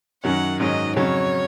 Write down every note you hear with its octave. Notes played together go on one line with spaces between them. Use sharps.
F#2 D#3 F#3 C#4 F#5
G#2 D#3 F#3 C#4 D#5
F2 C#3 F#3 C#4 C#5